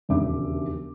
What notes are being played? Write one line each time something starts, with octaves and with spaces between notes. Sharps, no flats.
E1 A#1 D#2 C#3 E5 D6